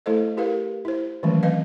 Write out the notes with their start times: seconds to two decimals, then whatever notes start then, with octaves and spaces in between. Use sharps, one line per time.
0.06 A3 E4 A4 C5 D#5
0.37 E4 G4 A#4 B4 F5
0.85 E4 C5
1.23 D#3 E3 F#3 G#3 A3 C#4
1.43 C4 B4 D#5 F5